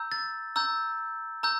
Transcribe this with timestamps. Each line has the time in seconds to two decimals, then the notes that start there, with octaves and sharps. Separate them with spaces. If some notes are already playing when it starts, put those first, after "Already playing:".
Already playing: A#5 E6 G6
0.12 A6
0.56 A#5 E6 G6
1.43 A#5 E6 G6